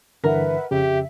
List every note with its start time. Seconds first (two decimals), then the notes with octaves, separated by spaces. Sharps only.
0.24 G2 D3 E3 A#4 B4 E5 F#5
0.71 F2 C#3 G4 E5